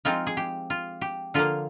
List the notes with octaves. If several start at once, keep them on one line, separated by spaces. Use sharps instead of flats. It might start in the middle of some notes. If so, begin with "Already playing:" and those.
F3 G#3 C4 D#4 F4
G#4
G4
F4
G4
D3 F3 A#3 F4